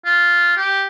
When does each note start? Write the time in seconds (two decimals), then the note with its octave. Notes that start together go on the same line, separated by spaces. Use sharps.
0.05 F4
0.57 G4